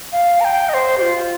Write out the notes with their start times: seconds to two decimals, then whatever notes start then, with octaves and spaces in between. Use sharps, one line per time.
0.12 F5
0.40 A#5
0.44 G5
0.69 D#5
0.74 C5
0.98 G4
1.01 F4